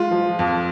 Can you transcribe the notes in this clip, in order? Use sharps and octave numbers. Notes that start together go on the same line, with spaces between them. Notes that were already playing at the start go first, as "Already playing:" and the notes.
Already playing: G#3 F4
F3
F2